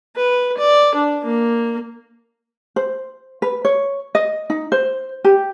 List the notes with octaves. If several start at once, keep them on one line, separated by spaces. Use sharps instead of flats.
B4
D5
D4
A#3
C5
B4
C#5
D#5
D#4
C5
G4